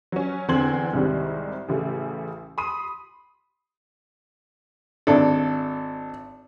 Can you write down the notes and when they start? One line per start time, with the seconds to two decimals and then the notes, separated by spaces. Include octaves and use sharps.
0.12 F#3 C#4
0.48 E2 D3 C4 C6 G#6 F#7
0.93 C2 G#2 C3 D#3 G3
1.69 A1 C#3 A3
2.58 B5 C6 D#6 D#7
5.07 G#1 D4 A4